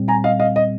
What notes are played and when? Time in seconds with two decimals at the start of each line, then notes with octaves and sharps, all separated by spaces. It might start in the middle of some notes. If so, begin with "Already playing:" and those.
Already playing: A#2 G3 C4
0.08 G#5 A#5
0.24 D#5 F5
0.40 D#5 F5
0.56 D#5